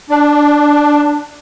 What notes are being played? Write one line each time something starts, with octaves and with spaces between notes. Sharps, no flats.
D4